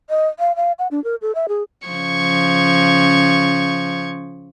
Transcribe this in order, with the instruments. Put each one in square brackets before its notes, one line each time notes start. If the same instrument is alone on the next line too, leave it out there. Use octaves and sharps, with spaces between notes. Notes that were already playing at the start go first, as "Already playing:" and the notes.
[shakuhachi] D#5
F5
F5
F#5
D4
A#4
A4
E5
G#4
[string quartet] C#3 F3 C#6 G#6